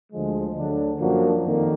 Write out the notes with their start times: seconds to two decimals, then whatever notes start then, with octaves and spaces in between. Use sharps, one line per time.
0.12 D2 D3 F3 G#3
0.56 D2 D3 F#3 D4
1.00 F#2 F3 A#3 D4 F#4
1.44 F2 D#3 A#3